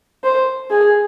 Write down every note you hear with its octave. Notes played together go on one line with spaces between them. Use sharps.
C5
G#4